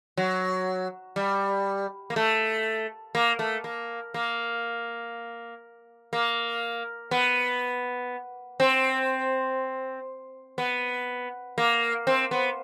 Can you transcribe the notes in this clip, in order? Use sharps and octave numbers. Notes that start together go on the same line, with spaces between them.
F#3
G3
A#3
A3
A#3
A3
A#3
A#3
A#3
B3
C4
B3
A#3
C4
B3